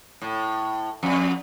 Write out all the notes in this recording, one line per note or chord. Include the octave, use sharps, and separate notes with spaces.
A2
F2